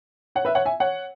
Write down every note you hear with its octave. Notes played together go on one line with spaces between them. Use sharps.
C#5 F#5
B4 E5
C#5 F#5
E5 G#5
C#5 F#5